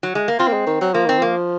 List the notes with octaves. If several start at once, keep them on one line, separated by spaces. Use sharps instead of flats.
F#3
G#3
A#3
C4 F4
A#3
G#3
D#3
F#3
F3 A#3
D#3 C4
F3 A#3